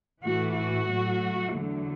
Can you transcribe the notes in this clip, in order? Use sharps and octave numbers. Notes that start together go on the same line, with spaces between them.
A2 E3 A3 F#4
F#4
A2 F#3 A3
E2 D3 F#3 A3